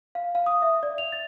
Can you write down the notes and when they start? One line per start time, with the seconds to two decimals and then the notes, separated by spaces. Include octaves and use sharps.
0.15 F5
0.35 F5
0.46 D#6
0.62 E5
0.83 D5
0.98 F7
1.12 A6